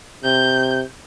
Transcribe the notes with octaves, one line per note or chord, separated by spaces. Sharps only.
C3 G6